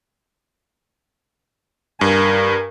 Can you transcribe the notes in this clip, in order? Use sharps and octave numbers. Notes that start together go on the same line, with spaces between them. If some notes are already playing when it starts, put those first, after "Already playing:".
G2 A#4 G#5